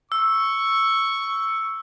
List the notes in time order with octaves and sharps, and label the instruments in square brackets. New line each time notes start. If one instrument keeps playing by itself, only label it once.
[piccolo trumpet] C#6 [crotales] E6